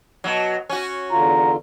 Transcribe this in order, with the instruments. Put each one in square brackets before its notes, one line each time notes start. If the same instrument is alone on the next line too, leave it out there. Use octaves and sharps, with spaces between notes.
[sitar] B2 F#3
C#4 F#4
[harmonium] E2 D3 F4 [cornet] A#5